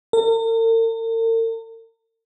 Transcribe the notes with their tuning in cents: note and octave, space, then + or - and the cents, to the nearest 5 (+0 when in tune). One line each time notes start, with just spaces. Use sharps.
A#4 -45